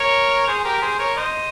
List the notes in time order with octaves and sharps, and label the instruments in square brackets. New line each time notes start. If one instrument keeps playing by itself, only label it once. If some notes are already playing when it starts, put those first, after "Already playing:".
Already playing: [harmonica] A#4 C#5
G#4 C5
G4 A#4
G#4 C5
A#4 C#5
C5 D#5